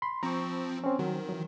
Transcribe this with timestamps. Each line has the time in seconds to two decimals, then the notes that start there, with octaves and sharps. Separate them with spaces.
0.02 B5 C6
0.23 F3 C4 A#5 C#6
0.84 C4 C#4
0.99 D#3 F#3
1.29 E3 F#3